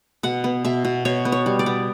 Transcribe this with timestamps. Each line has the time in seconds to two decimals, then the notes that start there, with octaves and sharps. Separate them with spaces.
0.23 B2 F#5
0.44 B3
0.65 B2 E5
0.85 B2
1.05 B2 C#5
1.25 B3
1.32 C#5
1.46 G3
1.59 D5
1.66 B3